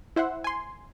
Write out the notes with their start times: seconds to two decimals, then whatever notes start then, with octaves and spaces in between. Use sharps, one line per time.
0.16 E4 C5 E5 F#5
0.44 G#5 C6